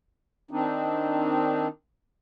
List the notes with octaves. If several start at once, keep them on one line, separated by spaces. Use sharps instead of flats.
D#3 C4 D4 D#4